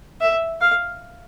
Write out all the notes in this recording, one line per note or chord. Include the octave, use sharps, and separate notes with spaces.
E5
F5